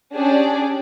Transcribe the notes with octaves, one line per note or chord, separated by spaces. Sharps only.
C#4 D4 G4 G#4 D5